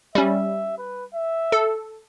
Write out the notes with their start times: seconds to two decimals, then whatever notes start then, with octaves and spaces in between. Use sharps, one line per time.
0.15 G3 C#4 E5
0.78 B4
1.14 E5
1.52 A4